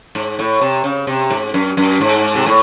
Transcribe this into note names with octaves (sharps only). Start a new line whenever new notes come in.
G#2
A2
C3
C#3
C3
G#2
F#2
F#2
G#2
C3
A2